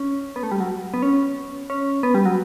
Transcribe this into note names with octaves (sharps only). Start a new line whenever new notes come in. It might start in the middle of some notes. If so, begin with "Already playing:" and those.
Already playing: C#4
B3
A3
G3
F#3
B3
C#4
C#4
B3
G3
F#3